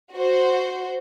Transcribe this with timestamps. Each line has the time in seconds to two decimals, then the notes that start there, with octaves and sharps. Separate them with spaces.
0.13 F#4 C5